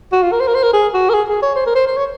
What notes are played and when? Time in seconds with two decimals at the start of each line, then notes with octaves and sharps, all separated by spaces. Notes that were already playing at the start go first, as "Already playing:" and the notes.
0.12 F#4
0.23 F4
0.32 A#4
0.40 C5
0.47 A#4
0.55 C5
0.63 A#4
0.73 G#4
0.94 F#4
1.10 A#4
1.14 G#4
1.29 G#4
1.43 C#5
1.56 C5
1.66 A#4
1.76 C5
1.87 C5
1.97 C#5